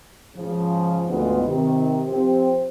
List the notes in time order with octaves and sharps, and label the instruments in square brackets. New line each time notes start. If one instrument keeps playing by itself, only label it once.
[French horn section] G#2 C#3 F3
D2 G#2 B3 F4 D#5
C3 D#3
F3 C4 G4 C5